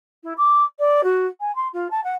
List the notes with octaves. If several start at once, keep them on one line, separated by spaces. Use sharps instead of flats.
E4
D6
D5
F#4
G#5
C6
F4
A5
F#5